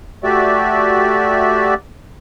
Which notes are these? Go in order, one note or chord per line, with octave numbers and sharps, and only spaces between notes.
A3 F#4 G4 D5 E5